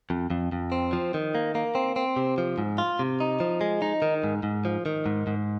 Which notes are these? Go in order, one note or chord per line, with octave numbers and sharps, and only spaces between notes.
F2
F2
F2
C4
F3
D#3
A#3
A#3
C4
C4
C3
F3
G#2
F4
C3
D#4
F3
G#3
D#4
D#3
G#2
G#2
F3
D#3
G#2
G#2